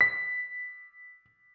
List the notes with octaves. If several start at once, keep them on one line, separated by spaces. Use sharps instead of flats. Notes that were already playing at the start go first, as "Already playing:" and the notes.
B6